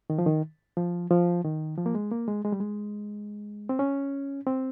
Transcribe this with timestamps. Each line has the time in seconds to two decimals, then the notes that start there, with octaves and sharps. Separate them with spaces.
0.10 D#3
0.19 F3
0.27 D#3
0.77 F3
1.10 F3
1.44 D#3
1.78 F3
1.86 A#3
1.95 G#3
2.12 A#3
2.28 G#3
2.45 G#3
2.52 G3
2.60 G#3
3.69 C4
3.79 C#4
4.47 C4